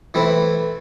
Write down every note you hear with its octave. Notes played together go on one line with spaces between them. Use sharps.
E3 A3 C4 E4